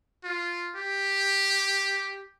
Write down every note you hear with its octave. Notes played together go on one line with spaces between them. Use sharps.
F4
G4